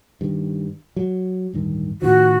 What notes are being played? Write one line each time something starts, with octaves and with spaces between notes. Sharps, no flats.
G2 D#3
F#3
D1 G2 D#3
A2 D#3 F3 F#4